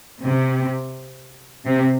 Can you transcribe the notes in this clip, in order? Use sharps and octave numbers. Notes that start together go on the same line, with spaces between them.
C3
C3